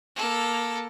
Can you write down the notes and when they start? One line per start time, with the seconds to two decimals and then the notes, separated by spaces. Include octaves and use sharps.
0.16 A#3 A4